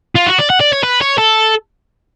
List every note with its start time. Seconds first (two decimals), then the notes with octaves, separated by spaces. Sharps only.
0.15 F4
0.26 F#4
0.38 D5
0.50 F#5
0.61 D5
0.73 C#5
0.83 B4
1.01 C#5
1.18 A4